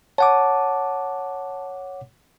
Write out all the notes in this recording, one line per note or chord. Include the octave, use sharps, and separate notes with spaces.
C#5 F#5 A5 D6